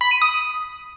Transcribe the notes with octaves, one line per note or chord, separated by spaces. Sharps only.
B5
D#7
D#6